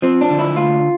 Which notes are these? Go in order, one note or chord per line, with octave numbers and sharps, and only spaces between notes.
F3 C4
D4
D3
E4
D2 F4